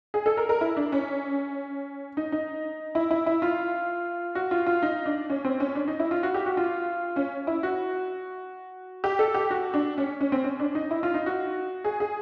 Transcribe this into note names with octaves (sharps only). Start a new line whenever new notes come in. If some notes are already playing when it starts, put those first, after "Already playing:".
G#4
A4
A#4
A#4
E4
D4
C#4
D#4
D#4
E4
E4
E4
F4
F#4
F4
F4
D#4
D4
C#4
C4
C#4
D4
D#4
E4
F4
F#4
G4
F#4
F4
C#4
E4
F#4
G4
A4
G4
F#4
D4
C#4
C#4
C4
C#4
D4
D#4
E4
F4
D#4
F#4
G#4
G#4